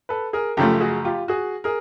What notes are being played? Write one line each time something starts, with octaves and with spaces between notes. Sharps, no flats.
A4 B4
G#4 A#4
F#2 C#3 F3 A3 G4 A4
F#4 G#4
F4 G4
F#4 G#4
G#4 A#4